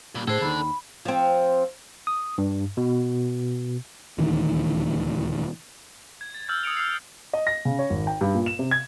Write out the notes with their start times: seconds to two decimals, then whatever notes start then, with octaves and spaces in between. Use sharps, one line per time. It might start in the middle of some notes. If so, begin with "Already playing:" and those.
0.15 A#2 G3
0.27 A2 D4 G#4 A4 C5
0.41 D#2 D#3 B5
1.05 F3 C4
2.07 D#6
2.38 G2
2.77 B2
4.18 D#1 D2 D#3 E3
6.21 G#6
6.35 A6
6.48 E6 F6 G6 G#6
6.63 D#6 C#7 D7 F7
6.77 F6 C7
7.33 D#5
7.47 A#6
7.65 C#3
7.79 C#5
7.90 G#1
8.07 G5
8.21 G2
8.35 A#2
8.46 E7
8.59 C3
8.71 G#6